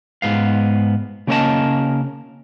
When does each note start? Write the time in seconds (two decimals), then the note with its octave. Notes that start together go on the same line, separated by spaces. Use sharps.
0.22 G#2 B3 F5
1.27 C#3 A#3 C#4 A#4 D#5 A5